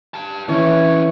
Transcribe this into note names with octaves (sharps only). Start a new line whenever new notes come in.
G4 A5
F2 E3 C#4 C#5 E5